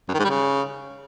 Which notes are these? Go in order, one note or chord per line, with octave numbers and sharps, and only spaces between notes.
F#2
D#3
G#2
G3
C#3